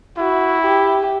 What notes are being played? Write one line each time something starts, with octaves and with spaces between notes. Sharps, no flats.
E4 F#4
G4